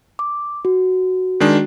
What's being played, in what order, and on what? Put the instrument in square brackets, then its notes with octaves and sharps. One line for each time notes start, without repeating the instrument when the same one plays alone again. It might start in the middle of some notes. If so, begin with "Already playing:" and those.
[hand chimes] D6
F#4
[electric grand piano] D#3 G#3 D4